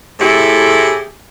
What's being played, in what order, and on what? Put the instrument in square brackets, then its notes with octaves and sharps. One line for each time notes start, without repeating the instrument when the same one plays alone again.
[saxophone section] A2 C3 A3 E4 G4 G#4